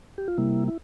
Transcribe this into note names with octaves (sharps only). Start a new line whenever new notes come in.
G4
F4
C3 G3 A#3 E4
E4